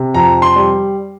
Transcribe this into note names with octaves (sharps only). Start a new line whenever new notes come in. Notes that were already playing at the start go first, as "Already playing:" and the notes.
Already playing: C3
F2 A#5
C6
G3